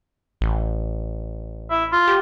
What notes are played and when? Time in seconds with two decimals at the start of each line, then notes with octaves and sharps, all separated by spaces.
0.41 A1
1.71 E4
1.92 F4
2.07 G4